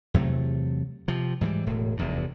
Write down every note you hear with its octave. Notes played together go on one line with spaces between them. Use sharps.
E2 C3 F#3 A3
C3 F3
G#2 E3 F3 G3
E1 A2
F1 E2 G2